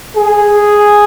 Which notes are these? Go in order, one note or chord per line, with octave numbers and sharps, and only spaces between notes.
G#4